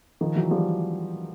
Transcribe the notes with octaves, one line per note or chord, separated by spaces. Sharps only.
D#3 F3
E3 F#3
F3 G3